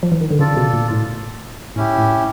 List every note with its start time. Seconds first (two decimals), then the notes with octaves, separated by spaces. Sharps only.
0.03 F3
0.12 E3
0.21 D#3
0.31 D3
0.39 C#3 F4 A4 D5
0.57 B2
0.74 A#2
0.91 A2
1.76 A2 C#4 E4 G4
1.99 A2